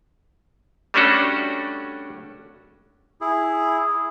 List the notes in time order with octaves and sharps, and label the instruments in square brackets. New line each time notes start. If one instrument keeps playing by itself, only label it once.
[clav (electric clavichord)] G3 A3 C#4 D4 F#4 A4
[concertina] E4 G#4